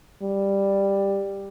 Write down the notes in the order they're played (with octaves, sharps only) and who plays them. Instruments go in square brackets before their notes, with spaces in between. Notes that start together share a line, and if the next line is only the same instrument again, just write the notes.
[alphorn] G3